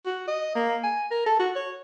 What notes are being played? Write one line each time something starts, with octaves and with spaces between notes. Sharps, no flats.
F#4
D#5
A#3
G#5
A#4
A4
F#4
C#5